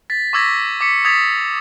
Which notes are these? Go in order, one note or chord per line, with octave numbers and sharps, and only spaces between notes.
A6 B6
C#6 D6 E6 G#6 A#6 B6
D6 B6 C#7
D#6 G#6 A6 B6 F7